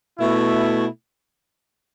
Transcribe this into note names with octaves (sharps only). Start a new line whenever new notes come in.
B2 A3 E4